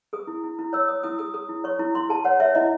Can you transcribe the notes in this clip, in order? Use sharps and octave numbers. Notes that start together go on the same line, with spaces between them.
G#4 D#6
E4
E4
E4
C#5 E6
C#5 D#6
E4 D#6
G#4 D#6
G#4 D#6
E4
C#5 C#6
E4
E4 C6
G#4 A5
C#5 F#5
C#5 E5
E4 D#5